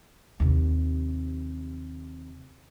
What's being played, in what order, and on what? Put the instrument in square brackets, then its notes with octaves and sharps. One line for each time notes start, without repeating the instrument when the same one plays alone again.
[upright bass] D#2 C3